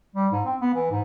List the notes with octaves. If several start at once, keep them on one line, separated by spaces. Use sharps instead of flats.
G3
G#2
C4
B3
E3
G#2